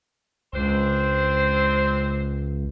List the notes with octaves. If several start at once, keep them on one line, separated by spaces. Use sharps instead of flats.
C#2 C4 D4 C5